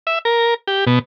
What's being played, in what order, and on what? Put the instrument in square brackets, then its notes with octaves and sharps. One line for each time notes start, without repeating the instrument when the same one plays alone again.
[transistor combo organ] E5
A#4
G4
B2